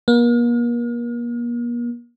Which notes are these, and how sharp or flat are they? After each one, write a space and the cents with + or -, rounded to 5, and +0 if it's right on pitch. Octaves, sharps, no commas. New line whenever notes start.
A#3 +40